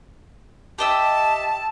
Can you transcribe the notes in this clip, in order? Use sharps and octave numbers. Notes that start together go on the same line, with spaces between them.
G4 D#5 E5 A5